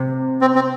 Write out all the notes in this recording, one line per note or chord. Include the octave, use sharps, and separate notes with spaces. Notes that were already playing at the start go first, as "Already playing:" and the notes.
Already playing: C3
C4
C4